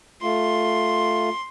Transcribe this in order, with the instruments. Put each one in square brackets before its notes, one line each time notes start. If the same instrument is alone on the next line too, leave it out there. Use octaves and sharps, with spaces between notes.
[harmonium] A3 F4 [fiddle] C6